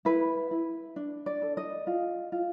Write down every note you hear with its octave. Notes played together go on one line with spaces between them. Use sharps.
E4 B4
E4
D4
D5
A4
D#5
F4
F4